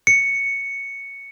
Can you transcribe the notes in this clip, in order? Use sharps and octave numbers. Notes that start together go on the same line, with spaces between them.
C#7